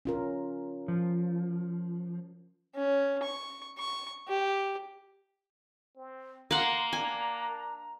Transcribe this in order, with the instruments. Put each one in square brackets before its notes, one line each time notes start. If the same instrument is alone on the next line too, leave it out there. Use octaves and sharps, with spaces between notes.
[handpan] C#4 F4 A#4
[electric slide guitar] F3
[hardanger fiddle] C#4
C#6
C#6
G4
[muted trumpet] C4
[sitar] A#3 [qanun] F5 F#5 [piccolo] A#5 [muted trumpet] C6
[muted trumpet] D4 [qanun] G#5